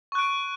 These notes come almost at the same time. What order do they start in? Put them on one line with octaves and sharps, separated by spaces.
C#6 F#6 D7